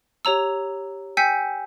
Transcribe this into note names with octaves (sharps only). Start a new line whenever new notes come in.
G4 C#5 A#5 E6
G5 G#5 E6 G6 B6 C#7